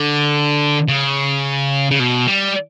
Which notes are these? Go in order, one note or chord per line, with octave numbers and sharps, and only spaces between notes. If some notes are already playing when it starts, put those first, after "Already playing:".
Already playing: D3
C#3
C#3
B2
G3